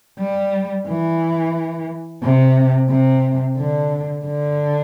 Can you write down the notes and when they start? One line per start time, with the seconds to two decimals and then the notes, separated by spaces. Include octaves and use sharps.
0.19 G3
0.87 E3
2.23 C3
2.90 C3
3.57 D3
4.25 D3